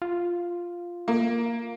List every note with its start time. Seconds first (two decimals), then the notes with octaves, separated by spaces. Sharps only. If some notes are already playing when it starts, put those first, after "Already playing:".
0.02 F4
1.08 A#3